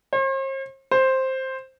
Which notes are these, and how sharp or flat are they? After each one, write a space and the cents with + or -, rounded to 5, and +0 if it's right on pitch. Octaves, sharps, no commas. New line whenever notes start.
C5 +45
C5 +5